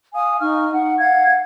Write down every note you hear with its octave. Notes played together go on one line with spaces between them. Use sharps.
F5 G#5 D#6
D#4 F5 C#6 F6
F#5
F5 F#5 G#6